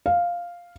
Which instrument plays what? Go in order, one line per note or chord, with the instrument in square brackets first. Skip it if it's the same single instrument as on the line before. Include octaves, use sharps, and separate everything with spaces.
[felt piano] F5